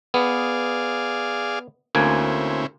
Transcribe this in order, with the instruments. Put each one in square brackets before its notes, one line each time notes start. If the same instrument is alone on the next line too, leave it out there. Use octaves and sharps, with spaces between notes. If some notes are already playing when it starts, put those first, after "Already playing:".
[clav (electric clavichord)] B3 [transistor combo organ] G#4 D5 F5
[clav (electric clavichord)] D2 A#3 G#5 [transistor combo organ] C4 C#4 E4